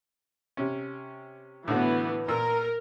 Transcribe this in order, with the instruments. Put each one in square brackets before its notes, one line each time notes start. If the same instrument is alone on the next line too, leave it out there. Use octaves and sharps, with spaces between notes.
[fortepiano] C3 C#4
[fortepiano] A2 D3 F#4 [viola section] E3 B3
[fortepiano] A#2 E6 [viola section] A#4